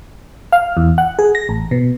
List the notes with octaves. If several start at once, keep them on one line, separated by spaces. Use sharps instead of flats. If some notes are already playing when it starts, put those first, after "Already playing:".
F5
E2
F#5
G#4
A#6
A1
B2